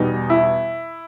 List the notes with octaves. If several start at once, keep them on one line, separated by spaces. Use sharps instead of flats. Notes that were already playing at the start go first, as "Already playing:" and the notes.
Already playing: E2 B2 G3 D#4
E4